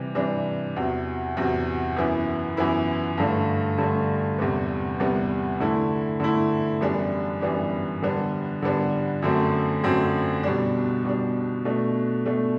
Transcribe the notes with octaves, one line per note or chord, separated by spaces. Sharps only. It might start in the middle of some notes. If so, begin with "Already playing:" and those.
Already playing: C3 E3 G3
C3 E3 G3 D4
E2 C3 F#3
E2 C3 F#3
F#2 E3 B3 E4
F#2 E3 B3 E4
G2 D3 A3 D4
G2 D3 A3 D4
E2 C3 G3 B3
E2 C3 G3 B3
D3 A3 E4
D3 A3 E4
F#2 E3 G3 B3 D4
F#2 E3 G3 B3 D4
D3 G3 B3 D4
D3 G3 B3 D4
F#2 D3 F#3 A3 C4
F#2 D3 F#3 A3 C4
B2 G3 D4
B2 G3 D4
B2 A3 D4
B2 A3 D4